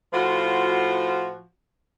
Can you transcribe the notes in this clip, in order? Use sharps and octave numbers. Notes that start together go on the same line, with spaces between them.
A2 F3 F4 F#4